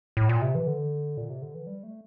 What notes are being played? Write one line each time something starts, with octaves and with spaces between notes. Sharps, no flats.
A2
A#2
C3
E3
D3
A#2
C3
D3
E3
G3
A3